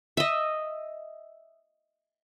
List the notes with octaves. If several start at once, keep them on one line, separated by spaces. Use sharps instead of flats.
D#5 E5